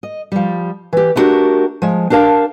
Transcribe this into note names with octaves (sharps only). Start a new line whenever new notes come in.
D#5
F3 G3
E3 G4
A3 B3 D4 F#4 G4 A#4
F3 G#3
D4 G4 A#4 F5 A5